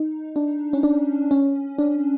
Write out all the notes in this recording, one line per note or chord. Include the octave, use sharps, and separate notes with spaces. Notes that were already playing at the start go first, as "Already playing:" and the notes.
Already playing: D#4
D4
C#4
D4
C#4
D4